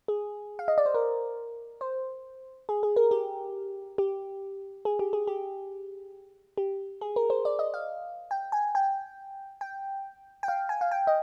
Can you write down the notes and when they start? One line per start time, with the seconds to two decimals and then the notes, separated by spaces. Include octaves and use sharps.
0.08 G#4
0.59 F5
0.68 D#5
0.78 D5
0.85 C5
0.94 A#4
1.81 C5
2.69 G#4
2.83 G#4
2.96 A#4
3.11 G4
3.98 G4
4.85 G#4
4.99 G4
5.13 G#4
5.27 G4
6.58 G4
7.01 G#4
7.16 A#4
7.30 C5
7.45 D5
7.59 D#5
7.74 F5
8.31 G5
8.52 G#5
8.75 G5
9.61 G5
10.43 G5
10.48 F5
10.69 G#5
10.81 F5
10.91 G5
11.07 D#5